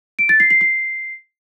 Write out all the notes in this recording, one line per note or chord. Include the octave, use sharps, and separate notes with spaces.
D7
A6
C7
C7
C7